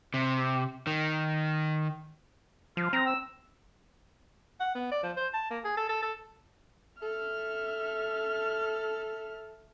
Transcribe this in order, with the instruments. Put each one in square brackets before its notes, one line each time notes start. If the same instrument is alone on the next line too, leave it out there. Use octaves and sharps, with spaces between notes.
[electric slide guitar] C3
D#3
[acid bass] F3 [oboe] F4
[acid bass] C4 [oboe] A#5
[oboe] E6
[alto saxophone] F#5
B3
D5
F3
C5
A5
A#3
G#4
A4
A4
A4
[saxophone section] A4 [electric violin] E5 F6